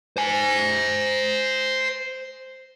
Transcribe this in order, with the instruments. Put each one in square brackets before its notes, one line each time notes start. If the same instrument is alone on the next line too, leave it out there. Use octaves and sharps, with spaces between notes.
[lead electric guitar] C5 G#5